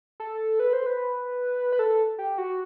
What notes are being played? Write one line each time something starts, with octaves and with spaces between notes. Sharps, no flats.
A4
B4
C5
B4
B4
A4
G4
F#4